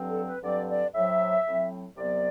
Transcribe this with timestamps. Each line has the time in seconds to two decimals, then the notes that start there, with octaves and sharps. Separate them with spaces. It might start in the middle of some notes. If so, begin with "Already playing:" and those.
Already playing: G2 D3 F#3 C4
0.10 A4
0.26 B4
0.43 G2 D3 F#3 C4 D5
0.70 D5
0.95 A2 F#3 C4 E5
1.46 A2 F#3 C4
1.97 C2 C3 F#3 B3 D5